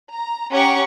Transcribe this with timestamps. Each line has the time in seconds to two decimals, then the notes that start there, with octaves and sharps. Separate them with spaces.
0.13 A#5
0.51 C#4 G4 F#5 A#5 C#6